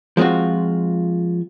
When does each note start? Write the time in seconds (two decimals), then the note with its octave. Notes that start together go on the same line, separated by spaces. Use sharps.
0.17 F3 G#3 C4 F4 F#4